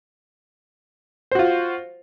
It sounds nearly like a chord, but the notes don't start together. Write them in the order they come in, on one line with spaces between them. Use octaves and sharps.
C5 F#4 F4